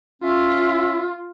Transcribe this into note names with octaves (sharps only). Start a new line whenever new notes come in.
C#4 F4 E5